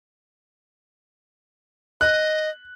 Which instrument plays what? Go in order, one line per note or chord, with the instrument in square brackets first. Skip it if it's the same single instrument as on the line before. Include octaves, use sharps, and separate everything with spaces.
[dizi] D#5 [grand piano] F#6